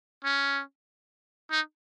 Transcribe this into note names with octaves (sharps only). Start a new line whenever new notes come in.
C#4
D#4